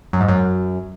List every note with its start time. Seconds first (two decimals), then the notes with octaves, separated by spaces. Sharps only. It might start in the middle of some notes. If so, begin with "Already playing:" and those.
0.13 F#2
0.21 G#2
0.28 F#2